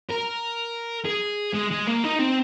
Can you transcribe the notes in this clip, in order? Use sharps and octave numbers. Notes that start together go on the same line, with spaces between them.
A#4
G#4
G#3
G#3
A#3
D#4
C4